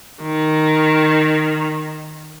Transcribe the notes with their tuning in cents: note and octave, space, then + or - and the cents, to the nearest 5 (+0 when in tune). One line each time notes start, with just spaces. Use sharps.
D#3 -5